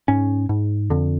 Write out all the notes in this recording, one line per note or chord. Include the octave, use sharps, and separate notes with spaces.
G#2 C#4
G#2
F2 D3